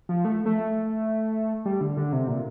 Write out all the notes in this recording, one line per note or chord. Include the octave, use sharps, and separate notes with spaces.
F3
A3
A3
G3
D3
D3
C3
A#2